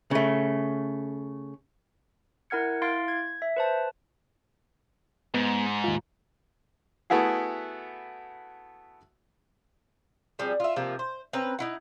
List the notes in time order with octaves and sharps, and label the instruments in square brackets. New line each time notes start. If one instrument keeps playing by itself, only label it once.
[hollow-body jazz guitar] C#3 A3
[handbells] E4 A#4 F#5 F6 G#6 C#7
E4 F5 C6 A6 D7
G#6
E5
B4 C5 A5
[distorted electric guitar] G#2 [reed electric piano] B3
[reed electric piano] D#2 F4
[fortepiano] A3 B3 E4 F#4 G#4
[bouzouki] F3 G3 C4 G#4
F4 E5
C3 F3 A#3
C5
C4 C#4 B4 A#5
D#4 E4 F#5